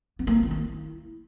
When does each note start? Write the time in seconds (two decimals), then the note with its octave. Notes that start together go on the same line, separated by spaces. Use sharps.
0.19 B3
0.27 A#3
0.35 E4
0.43 D#3
0.51 E4